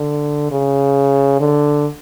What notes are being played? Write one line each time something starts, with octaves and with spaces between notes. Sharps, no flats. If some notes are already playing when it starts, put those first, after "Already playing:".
Already playing: D3
C#3
D3